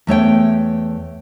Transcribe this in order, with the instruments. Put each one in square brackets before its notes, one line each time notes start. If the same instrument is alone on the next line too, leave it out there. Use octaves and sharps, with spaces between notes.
[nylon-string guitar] E2 A3 C#5 G5